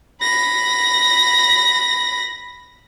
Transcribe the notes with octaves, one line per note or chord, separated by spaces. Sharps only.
B5 A#6